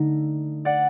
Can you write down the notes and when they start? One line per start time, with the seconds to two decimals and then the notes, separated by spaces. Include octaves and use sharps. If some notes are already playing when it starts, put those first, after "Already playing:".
Already playing: D3 A3 D#4 D#5
0.65 D5 F#5